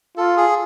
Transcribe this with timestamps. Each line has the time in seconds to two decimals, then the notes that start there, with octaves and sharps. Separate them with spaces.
0.17 F4 A4
0.37 G#4